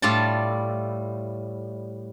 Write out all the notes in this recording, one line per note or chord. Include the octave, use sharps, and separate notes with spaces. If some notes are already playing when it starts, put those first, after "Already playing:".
A2 G3 F4 D5 A5